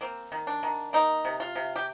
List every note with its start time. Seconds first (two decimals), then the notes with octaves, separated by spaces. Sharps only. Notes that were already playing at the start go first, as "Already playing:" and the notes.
0.01 A#3 C4
0.32 D#3
0.47 D4
0.63 D#3
0.93 A#3 D#4
1.25 C3
1.40 F4
1.55 C3
1.76 G4